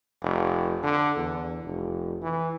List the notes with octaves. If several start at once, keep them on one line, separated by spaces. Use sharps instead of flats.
F1
D3
E2
F1
E3